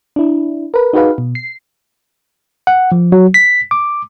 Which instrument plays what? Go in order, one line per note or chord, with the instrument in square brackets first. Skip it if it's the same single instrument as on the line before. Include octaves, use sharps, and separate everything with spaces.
[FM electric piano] D4 E4
A#4 B4
D#4 F#4 G#4 B4 F5
B2
C7
[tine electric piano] F#5
F3
F#3
B6
D6